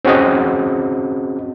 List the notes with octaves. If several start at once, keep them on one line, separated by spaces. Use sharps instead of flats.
C4 C#4 F#4 G#4 D#5